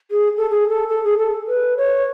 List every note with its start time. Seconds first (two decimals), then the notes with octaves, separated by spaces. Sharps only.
0.11 G#4
0.37 A4
0.50 G#4
0.69 A4
0.89 A4
1.04 G#4
1.18 A4
1.48 B4
1.77 C#5